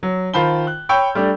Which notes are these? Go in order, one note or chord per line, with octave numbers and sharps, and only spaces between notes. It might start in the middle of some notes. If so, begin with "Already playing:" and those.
F#3
D#3 F4 C5 A5 B5 G7
F#6
C#5 G5 B5 E6 G6
G3 A3 D4